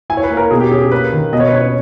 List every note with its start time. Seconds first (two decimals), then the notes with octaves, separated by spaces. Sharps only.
0.10 E4 G#5
0.17 C#5
0.24 B4
0.31 A#3
0.37 A#4
0.51 B2 G#4
0.60 G4
0.71 C#4 G#4
0.82 G#4
0.92 A#3 B4
1.12 D#3
1.32 B2 D#5
1.40 C#5
1.48 B4
1.53 C#4 C#5